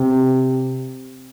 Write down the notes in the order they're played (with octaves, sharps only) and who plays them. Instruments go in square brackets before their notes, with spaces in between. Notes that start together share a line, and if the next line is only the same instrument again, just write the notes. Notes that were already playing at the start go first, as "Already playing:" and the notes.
Already playing: [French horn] C3